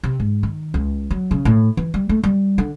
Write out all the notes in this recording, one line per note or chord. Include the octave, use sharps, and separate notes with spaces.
C3
G#2
D#3
C#2
F#3
C#3
A2
E3
G3
A3
G3
D3